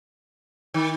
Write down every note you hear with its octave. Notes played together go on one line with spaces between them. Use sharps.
D#3